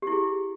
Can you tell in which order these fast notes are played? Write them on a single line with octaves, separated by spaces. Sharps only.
G4 E4 G#4